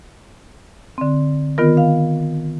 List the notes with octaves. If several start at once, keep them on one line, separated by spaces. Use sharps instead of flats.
D3 C4
D#3 B3 F4 A#4
F5